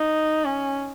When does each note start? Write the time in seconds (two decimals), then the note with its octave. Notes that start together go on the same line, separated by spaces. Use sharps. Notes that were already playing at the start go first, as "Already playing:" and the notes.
Already playing: D#4
0.45 C#4